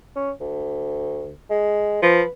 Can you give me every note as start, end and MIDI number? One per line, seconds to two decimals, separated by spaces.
0.16 0.31 61
0.40 1.34 38
1.50 1.99 56
2.02 2.22 53
2.02 2.29 71